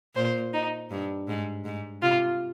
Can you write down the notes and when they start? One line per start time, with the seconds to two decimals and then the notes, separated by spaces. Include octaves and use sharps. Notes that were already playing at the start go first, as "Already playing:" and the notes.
0.15 A#2 C5
0.53 D#4
0.91 G2
1.28 G#2
1.65 G#2
2.02 C3 F4